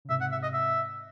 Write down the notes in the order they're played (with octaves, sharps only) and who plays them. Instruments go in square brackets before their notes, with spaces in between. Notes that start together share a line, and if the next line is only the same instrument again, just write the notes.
[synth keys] C#3
[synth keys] G#2 C3 [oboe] E5
[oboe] F#5
E5
D#5
E5